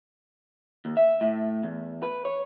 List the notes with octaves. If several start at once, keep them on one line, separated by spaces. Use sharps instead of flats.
D#2
E5
A2
E2
B4
C#5